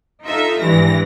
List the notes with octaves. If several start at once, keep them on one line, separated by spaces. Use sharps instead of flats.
D#4 F4 A4 E5
G#1 G2 E3 A#6